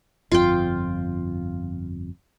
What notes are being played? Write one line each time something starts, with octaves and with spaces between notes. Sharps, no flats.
G1 F2 F4 G5